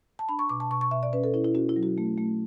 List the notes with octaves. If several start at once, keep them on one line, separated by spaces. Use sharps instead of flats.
A5
D4 B5
C#6
B2 D6
A5
B2 C#6
C#6
B2 E5
D5
C#4 B4
A4
C#4 E4
E4
C#4 F#4
E4
F#3
F#4
A3
A3